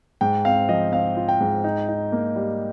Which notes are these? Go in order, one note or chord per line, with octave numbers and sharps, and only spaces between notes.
G#2 G5
C4 F5
F3 D#5
C4 F5
F4
G5
G#2
D#4
D#4
A#3
G3